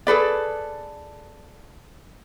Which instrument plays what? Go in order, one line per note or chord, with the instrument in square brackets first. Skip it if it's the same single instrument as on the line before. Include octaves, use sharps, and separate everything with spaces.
[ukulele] G#4 A4 B4 D5